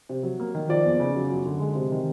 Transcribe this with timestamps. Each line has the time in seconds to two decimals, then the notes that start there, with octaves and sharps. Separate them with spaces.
0.09 C3
0.23 F#3
0.40 A#3
0.55 D#3
0.69 F3 D5
0.84 E2
1.00 C#3
1.15 F#3
1.31 F#2
1.46 D3
1.60 G#3
1.75 C3
1.91 D#3